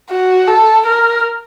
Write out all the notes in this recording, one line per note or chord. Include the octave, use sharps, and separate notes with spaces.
F#4
A4
A#4